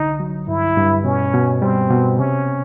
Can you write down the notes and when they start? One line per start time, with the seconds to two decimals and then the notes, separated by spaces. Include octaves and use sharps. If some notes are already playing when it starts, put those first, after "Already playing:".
Already playing: C2 D3 D#4
0.20 F#3
0.48 G2 E4
0.77 G2
1.05 B2 C#4
1.33 B2
1.62 G3 C4
1.91 B2
2.18 C3 C#4